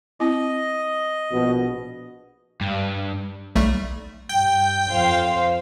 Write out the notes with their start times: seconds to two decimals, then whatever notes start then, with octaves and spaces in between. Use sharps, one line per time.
0.20 C4 E4 D#5
1.30 A#1 B2
2.61 G2
3.56 B1 G3 A3
4.29 G2 G5
4.92 F2 C5 F5